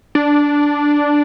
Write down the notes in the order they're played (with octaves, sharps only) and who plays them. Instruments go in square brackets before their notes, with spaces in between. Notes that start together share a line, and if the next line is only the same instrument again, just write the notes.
[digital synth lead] D4